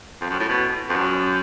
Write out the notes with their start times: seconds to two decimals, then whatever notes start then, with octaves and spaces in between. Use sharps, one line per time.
0.21 F2
0.30 F#2
0.40 A2
0.49 B2
0.89 F2
0.95 F#2